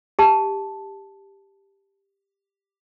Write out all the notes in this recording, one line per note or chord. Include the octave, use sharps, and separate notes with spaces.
G4 A5